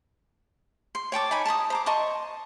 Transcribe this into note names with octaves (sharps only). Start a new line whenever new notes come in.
C6
C#5 G5 A5 D6
D#4 G#5 B5
A5 A#5 C6 D#6
C5 A#5 D6
D#5 A5 C6 C#6